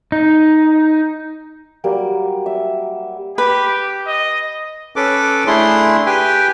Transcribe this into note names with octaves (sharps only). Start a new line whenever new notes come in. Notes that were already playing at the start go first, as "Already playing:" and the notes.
D#4
F#3 G3 A#3
E5
G4 B4
D#5
C#4 A4 B4 D6
A3 D4 E4 G#4 C6
G4 B4 G5 G#5